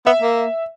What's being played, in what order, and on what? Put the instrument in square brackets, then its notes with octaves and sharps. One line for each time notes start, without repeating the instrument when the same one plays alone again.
[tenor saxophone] B3 [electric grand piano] E5
[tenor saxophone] A#3